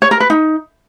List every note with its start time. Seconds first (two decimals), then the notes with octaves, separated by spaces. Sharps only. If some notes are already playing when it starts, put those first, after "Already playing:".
0.02 C#5
0.11 A#4
0.20 B4
0.30 D#4